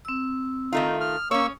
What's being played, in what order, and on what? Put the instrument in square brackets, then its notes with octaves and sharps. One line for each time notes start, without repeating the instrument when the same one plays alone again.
[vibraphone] C4 E6
[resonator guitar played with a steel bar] D#3 A3 F4 [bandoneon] D#4
[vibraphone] D#6 [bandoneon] F6
[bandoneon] A#3 C#6 E6 [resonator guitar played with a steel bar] C#4 C#5